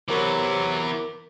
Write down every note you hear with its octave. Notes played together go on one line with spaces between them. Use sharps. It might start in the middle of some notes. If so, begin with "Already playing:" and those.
C3 E3 F#3 B3 A#4 D6